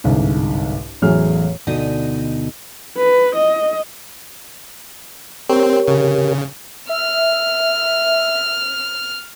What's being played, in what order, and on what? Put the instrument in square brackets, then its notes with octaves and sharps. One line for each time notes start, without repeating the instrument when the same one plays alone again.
[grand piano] G1 C2 G#2
A1 E2 A2 F#3 G#4 F6
[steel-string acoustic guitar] D2 B2 D#4 D#5
[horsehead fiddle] B4
D#5
[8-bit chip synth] C4 [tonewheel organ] G4 A#4 C#5
[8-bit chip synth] C#3
[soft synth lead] E5 [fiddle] F6